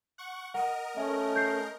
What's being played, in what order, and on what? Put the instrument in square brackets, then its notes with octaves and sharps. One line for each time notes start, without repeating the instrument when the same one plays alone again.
[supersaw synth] F#5 C#6
[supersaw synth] A#4 D#5 [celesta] F#5
[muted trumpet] A3 [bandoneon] C#4 [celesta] E5
[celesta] G6 C7